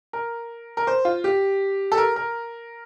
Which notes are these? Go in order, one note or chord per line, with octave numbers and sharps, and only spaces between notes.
A#4
A#4
C5
F4
G4
A4
A#4
A#4